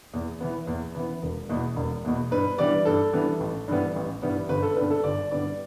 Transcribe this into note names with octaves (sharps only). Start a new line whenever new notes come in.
E2
E3 B3
E2
E3 B3
E1
E2 B2
E1
E2 B2
G2 B4
E3 G3 B3 D4 D5
G2 A4
E3 G3 B3 D4
A1
G2 E3 G3 B3
A1
G2 E3 G3 B3
G1 B4
A4
G2 D3 G3 B3 B4
A4
G1 D5
G2 D3 G3 B3 D5